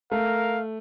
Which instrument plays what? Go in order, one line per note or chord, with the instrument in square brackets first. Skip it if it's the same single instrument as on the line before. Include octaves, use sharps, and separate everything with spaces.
[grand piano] A3 [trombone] A#4 [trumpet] F5